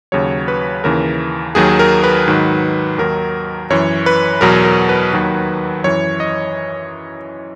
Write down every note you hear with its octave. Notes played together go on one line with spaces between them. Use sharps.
D#2 C#3 F#3 C#5
B4
D#2 C#3 E3 A#4
D#2 D#3 F#3 G#4
A#4
B4
G#2 D#3 F#3
D#2 D#3 F#3 A#4
F#2 E3 C#5
B4
E2 B2 F#3 A#4
A#4
B4
D#2 D#3 F#3
F#2 E3 C#5
D#5